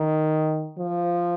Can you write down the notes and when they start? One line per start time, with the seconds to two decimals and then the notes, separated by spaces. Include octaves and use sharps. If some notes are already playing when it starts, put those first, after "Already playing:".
Already playing: D#3
0.78 F3